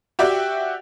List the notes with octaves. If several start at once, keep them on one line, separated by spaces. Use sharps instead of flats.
F#4 G4 D5 E5 G5